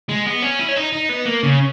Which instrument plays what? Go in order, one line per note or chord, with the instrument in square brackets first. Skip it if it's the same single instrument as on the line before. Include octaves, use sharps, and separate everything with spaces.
[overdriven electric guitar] G#3
B3
C#4
E4
C#4
D#4
D#4
B3
A#3
C#3